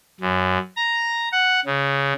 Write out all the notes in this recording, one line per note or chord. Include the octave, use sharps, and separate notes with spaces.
F#2
A#5
F#5
C#3